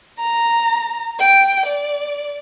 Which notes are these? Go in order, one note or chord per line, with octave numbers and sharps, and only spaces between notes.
A#5
G5
D5